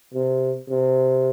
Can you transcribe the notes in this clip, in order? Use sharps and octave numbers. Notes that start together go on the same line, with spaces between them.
C3
C3